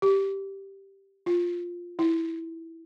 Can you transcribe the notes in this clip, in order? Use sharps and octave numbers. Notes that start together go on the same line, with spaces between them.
G4
F4
E4